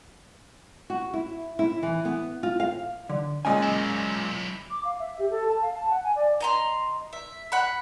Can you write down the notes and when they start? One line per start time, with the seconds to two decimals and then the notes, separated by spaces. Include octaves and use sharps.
0.90 F#4
1.14 E4
1.59 E4
1.83 E3
2.05 B3
2.43 F4
2.60 F5
3.09 D3
3.45 A#2 G#3 C#4 D#5 G#5
3.63 F#3 E4
4.71 D6
4.85 F5
5.00 E5
5.19 G4
5.30 A4
5.48 A5
5.62 F5
5.75 A5
5.90 F#5
6.04 G#5
6.16 D5
6.41 D#5 A#5 C6
7.13 E5
7.52 F#5 B5